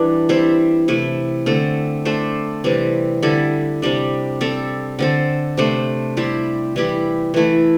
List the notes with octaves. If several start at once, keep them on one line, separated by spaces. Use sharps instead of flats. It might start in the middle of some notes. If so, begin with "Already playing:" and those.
Already playing: E3 G3 D4
G3 C4 E4 C5
C3 A3 E4
D3 A3 C4 A4
A3 D4 A4 C5
C3 E3 G3 C4
D3 G3 E4 A4
C3 G3 D4
G3 C4 A4
D3 C4 A4 C5
C3 A3 D4 C5
G3 E4 G4 C5
E3 G3 E4 G4
E3 A3 E4